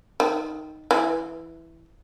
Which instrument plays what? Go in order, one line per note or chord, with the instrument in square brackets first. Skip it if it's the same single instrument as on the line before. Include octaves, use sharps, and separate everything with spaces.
[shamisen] D#3
E3